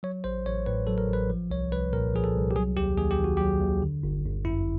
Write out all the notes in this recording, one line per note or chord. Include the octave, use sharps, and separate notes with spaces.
F#3 C#5
A1 C5
A1 C#5
A2 B4
F#3 A4
A#4
A1
B4
F3
C2 C#5
C2 B4
A#2 A#4
F3 G#4
A4
C2
G4
F#3 G#4
D#2 G4
D#2 G#4
G4
D#3 F#4
F#3 G4
D#2
D3
G1
G1
F#2 E4